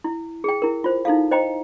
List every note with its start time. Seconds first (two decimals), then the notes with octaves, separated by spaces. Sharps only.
0.04 E4
0.44 G#4 G5
0.62 E4 A#4
0.84 F4 C5
1.05 D#4 E4 A4 F5
1.31 C5 D#5 G5 A#5